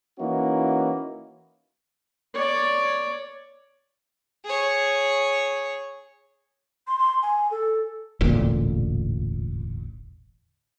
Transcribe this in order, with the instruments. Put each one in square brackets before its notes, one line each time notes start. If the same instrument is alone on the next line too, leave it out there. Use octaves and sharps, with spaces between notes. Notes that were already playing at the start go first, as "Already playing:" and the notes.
[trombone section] E3 A#3 C#4 D#4 E4 F#4
[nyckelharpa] C#5 D5
[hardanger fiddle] G#4 C#5
[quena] C6
C6
G#5
A4
[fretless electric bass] E1 A1 D2 A#2